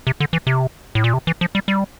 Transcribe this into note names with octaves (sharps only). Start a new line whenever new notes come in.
C3
D3
E3
C3
A2
A#2
C3
E3
F3
G3
G3